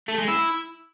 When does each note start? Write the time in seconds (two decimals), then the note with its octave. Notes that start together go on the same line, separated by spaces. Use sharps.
0.08 A3
0.18 G#3
0.28 E4